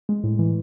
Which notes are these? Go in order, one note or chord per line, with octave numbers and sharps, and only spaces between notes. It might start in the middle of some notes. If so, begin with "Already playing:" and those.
G#3
A2
E3